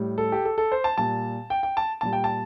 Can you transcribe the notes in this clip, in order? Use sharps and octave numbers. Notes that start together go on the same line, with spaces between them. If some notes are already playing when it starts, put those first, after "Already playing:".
Already playing: A2 G3
A4
G4
A4
A4
C5
A5
A#2 G3 A5
G5
G5
A5
A#2 G3 A5
G5
A5